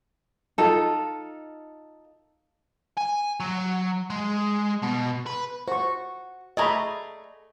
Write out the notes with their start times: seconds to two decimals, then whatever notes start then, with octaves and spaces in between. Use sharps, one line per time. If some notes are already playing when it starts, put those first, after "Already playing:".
0.58 D#4 F4 A4
2.97 G#5
3.40 F#3
4.10 G#3
4.82 B2
5.26 B4
5.68 F#4 C5 C#6
6.57 A3 G#4 D5 D#5 A#5 B5